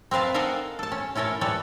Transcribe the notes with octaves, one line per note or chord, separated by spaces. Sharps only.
C4 A#4 B4 F5 A5
A4 A#4 D#5 F5 F#5 G#5
A4 A5
C#4
C#4 E4 A4 A#4 C#5
G3 A4 B4 C#5